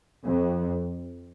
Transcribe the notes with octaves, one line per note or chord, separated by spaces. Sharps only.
F2